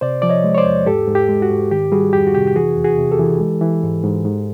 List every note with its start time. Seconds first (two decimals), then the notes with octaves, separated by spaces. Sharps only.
0.01 C3 C5 D5
0.22 F3 D5
0.29 C#5 D#5
0.44 G#3
0.55 C#5
0.58 C5 D5
0.65 E2
0.86 G#2 G4 A4
1.07 G#2
1.15 G4
1.29 G#3
1.42 F#4
1.50 G#2
1.71 D#3 G4
1.92 G3 F#4 G#4
2.13 F2 G4
2.27 F#4
2.35 C3 G4
2.47 G4
2.56 E3 F#4 G#4
2.76 E2
2.84 F#4 G#4
2.98 C3
3.12 G4 A4
3.19 E3
3.40 G#3
3.61 E3
3.83 G#2
4.04 G#2
4.25 G#2